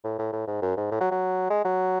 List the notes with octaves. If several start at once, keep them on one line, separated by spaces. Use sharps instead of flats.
A2
A2
A2
G#2
F#2
G#2
A2
F#3
F#3
G#3
F#3